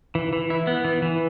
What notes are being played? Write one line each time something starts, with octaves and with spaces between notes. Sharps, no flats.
E3
E3
E4
B3
E3
E3